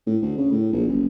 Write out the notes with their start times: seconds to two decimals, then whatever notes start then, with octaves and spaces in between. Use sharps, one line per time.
0.07 A2
0.22 D2
0.37 C#3
0.52 A2
0.73 A#1
0.87 F#1